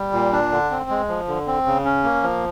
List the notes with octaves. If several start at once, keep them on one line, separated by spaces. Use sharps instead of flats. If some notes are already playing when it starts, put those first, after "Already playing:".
Already playing: G3
A#2
D4
D3
C4
G#3
F3
D3
C4
C#3
C#4
A#3
F3